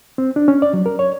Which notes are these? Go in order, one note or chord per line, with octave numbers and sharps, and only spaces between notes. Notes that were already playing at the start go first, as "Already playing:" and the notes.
C4
D4
C#4
D5
F#3
A#4
C#5